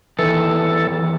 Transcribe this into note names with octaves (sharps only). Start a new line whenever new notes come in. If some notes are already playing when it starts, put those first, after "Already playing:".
E2 D#3 E3 A4